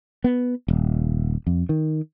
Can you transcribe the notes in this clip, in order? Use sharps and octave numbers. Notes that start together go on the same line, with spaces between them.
B3
D#1
F2
D#3